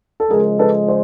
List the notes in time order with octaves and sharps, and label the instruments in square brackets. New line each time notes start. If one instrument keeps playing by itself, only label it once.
[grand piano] A4
[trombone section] C#3 F3 G#3 [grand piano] G#4 A#4
[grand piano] A4 B4
C5